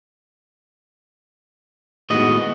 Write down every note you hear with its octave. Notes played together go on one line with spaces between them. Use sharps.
A2 D#3 G#3 B3 F#4 D#5